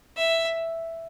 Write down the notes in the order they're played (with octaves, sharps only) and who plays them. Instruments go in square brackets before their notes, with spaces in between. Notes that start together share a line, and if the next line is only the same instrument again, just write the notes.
[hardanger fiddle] E5